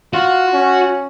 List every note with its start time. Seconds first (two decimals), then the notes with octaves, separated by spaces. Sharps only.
0.13 F4 F#4
0.54 C#4